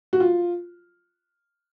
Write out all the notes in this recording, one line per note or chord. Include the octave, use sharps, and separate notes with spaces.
F#4
F4